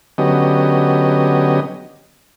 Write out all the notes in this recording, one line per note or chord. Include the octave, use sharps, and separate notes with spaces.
D3 F#3 B3 C#4 G4 D#5